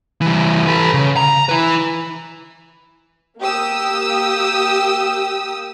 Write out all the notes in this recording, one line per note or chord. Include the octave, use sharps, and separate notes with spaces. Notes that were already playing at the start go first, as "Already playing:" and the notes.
E3 G3
A4 B4
C#3
A#5
E4 B4
A#3 G4 D#6 E6